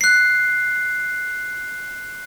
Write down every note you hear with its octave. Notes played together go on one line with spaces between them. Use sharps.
F#6 C7